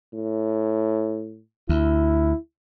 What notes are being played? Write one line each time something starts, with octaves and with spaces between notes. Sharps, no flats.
A2
D2 E4